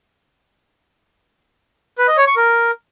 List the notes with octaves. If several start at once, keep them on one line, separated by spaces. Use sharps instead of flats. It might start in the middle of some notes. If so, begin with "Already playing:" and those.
B4
D#5
C#5
C#6
A#4